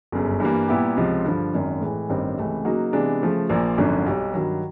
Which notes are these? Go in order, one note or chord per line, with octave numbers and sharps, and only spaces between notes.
G1 F#2 C#3
G2 E3 G3 A#3
A#2 G3 B3 E4 G4
C#2 C3 F3
G2 D3 F3
G#1 F#2 D#3
A2 E3 G#3
A1 G2 D#3 G3 C4
C#2 C3 E3 A3
C#3 F#3 A#3 D#4 F#4
C3 E3 G#3 B3 D4
C#3 F3 A3
A#1 A#2 F3 A#3
G#1 F#2 D3 F3
B1 B2 G3
G2 D#3 F#3